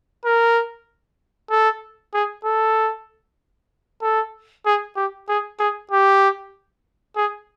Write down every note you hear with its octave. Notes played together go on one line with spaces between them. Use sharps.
A#4
A4
G#4
A4
A4
G#4
G4
G#4
G#4
G4
G#4